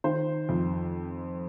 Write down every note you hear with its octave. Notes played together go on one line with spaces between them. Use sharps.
D#3 C5
F2